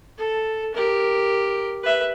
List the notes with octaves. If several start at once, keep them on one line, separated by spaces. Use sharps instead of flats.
A4
G4 A#4
B4 E5